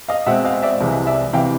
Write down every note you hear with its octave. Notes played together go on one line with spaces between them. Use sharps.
D#5 F5
B2 G#3 C4 E5 F#5
D#5 F5
D5 E5
C2 C3 E3 G#3
D5 E5
C3 E3 F5 G5